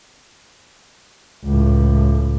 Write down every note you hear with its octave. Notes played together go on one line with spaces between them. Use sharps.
C#2 A2